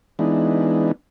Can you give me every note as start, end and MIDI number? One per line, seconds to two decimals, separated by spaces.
0.19 0.92 52
0.19 0.92 56
0.19 0.92 59
0.19 0.92 62
0.19 0.92 63